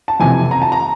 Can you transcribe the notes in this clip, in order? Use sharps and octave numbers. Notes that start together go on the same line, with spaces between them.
A5
F2 C3 E3 G#5
A#5
A5
A#5